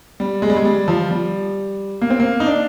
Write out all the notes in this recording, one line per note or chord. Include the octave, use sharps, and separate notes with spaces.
G3
G#3
G3
G#3
G3
F3
G3
A#3
C4
A#3
D#4
D4